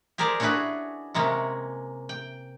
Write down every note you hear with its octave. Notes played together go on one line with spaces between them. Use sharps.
G4 G#4 A#4 C5 D5
C#4 D4 E4 F#4 G#4 B4
C3 G#3 A#3 C#4
G5